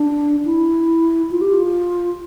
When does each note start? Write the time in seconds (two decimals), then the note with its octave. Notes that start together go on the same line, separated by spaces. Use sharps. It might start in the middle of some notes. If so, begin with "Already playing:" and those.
Already playing: D4
0.45 E4
1.31 F4
1.41 G4
1.53 F4